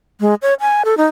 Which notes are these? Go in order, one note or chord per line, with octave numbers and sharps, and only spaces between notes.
G#3
C#5
G#5
A4
D#4